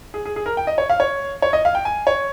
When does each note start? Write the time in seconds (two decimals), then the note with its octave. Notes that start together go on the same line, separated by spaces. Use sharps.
0.14 G#4
0.26 G#4
0.36 G#4
0.46 A#4
0.57 G5
0.67 D#5
0.78 C#5
0.89 F5
1.00 C#5
1.42 C#5
1.53 D#5
1.65 F5
1.75 G5
1.85 G#5
2.07 C#5